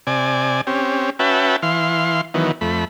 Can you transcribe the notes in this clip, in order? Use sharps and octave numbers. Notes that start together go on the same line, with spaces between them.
C3 D5 G#5
C4 C#4 G4
C#4 F#4 B4 E5 G5 A5
E3 F5 C6
D#3 E3 F#3 B3
F2 A3 B5